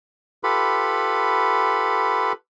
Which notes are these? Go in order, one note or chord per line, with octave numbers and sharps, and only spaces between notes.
F4 G4 A4 B4 B5